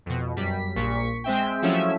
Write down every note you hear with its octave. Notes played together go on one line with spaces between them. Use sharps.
F2 B2
F#2 G3 B6
A#1 A#2 C#6 B6
G#3 C4 E5 G5
F3 F#3 A3 C#4 E4 E5